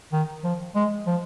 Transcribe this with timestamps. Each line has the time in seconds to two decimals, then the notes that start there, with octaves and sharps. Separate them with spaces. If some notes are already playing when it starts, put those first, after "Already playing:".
0.13 D#3
0.44 F3
0.75 G#3
1.07 F3